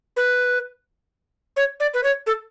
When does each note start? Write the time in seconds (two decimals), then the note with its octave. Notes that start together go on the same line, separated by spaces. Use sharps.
0.17 B4
1.57 C#5
1.80 D5
1.94 B4
2.04 C#5
2.27 A4